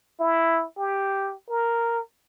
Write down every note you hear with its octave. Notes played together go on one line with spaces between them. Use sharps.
E4
G4
A#4